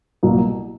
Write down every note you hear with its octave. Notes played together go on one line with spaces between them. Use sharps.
C2 B2 F#3 A#3